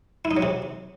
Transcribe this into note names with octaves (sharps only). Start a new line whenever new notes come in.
E4
D#4
F#3
C3